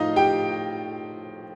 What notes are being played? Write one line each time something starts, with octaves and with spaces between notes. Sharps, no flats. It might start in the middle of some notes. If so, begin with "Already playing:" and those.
Already playing: A2 F3 A3 D#4 F4 D#5 F5
G4 G5